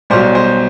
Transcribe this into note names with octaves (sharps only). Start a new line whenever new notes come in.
B1 B2 G3 C5
C5